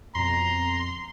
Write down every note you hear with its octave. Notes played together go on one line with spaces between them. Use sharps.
F2 B2 A#5 C6